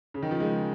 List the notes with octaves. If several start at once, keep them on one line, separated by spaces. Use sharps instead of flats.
C#3
D#3
F3
G#3